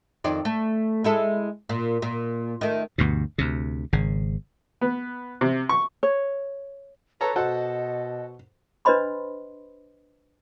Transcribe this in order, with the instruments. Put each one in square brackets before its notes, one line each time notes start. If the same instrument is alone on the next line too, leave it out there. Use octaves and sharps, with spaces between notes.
[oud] F2 D#3 D5
A3
G#3 E4 A4
A#2
A#2
D#3 A3
[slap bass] D2 G2 B2
D2 C3
G#1 C#3
[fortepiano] B3
C3
C#6
[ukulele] C#5
[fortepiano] A4 C#5 A#5 [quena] B4
[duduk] B2 [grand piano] F#4 [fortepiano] A4 C5 F#5 [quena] D#5
[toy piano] D4 B4 C5 D#5 B5 C6